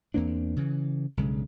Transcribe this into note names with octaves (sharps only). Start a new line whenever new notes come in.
E2 A#3 C4 D4
C#3 E3
B1 G2 C#3 G#3